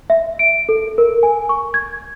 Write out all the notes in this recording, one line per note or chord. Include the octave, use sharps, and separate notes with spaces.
E5
D7
A4
A#4
G#5
C#6
G#6